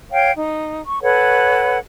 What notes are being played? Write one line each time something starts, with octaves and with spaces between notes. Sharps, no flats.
C#5 F5 G5
D#4
C#6
A4 B4 C#5 F#5